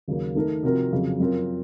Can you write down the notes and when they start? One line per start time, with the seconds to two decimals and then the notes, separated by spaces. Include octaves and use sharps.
0.08 D#2 C#3 F#3 A#3
0.35 D#3 A3 D#4 A#4
0.63 C3 F3 C4 F#4 A#4
0.92 F2 C#3 F#3
1.20 F#2 F3 C4 F4 A#4